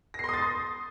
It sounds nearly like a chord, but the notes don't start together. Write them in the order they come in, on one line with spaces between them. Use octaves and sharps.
A#6 C7 C6 D#6 A6